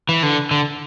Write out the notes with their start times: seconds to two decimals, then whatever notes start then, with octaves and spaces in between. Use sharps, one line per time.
0.09 E3
0.23 D3
0.51 D3